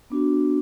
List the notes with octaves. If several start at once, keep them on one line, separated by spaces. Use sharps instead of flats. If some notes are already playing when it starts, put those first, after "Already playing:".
B3 D4 F#4